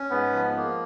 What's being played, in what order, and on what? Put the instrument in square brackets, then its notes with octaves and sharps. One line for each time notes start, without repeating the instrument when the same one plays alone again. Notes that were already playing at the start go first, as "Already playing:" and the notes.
Already playing: [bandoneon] C#4
[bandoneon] G#2 [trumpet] B3
[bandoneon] F3
A#3